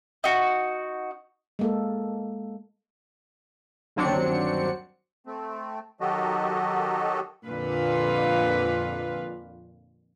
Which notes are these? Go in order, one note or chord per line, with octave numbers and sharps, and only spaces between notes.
D#4 F#4
G#3 A#3 A4
G1 D#2 F#3 C4 D4 C#7
A3 C4
D#3 F#3 F#4 G4 A4 D#5
F2 A#2 D3 F4 B4